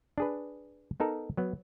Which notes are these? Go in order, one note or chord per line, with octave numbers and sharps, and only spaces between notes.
D4 G#4 B4
B3 D#4 A4 A#4
F#3 B3